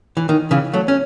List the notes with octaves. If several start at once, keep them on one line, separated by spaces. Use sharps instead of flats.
E3
D#3
C#3 E3
F#3 A3
C#4